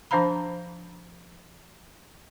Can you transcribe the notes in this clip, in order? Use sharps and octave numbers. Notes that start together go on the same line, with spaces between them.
F3 D4 C5 F5 A#5 B5